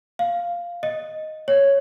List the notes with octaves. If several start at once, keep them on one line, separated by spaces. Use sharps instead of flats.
F5
D#5
C#5